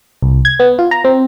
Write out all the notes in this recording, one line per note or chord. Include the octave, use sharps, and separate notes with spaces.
C2
G#6
B3
F4
A#5
C4